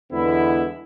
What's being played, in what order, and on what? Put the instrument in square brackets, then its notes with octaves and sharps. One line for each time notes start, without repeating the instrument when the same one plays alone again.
[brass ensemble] E2 D3 G#3 B3 E4